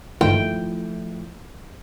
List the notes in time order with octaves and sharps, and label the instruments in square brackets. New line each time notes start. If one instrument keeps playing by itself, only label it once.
[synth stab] G1 D#2 G#2 [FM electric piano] F3 A3 E4 [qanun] G5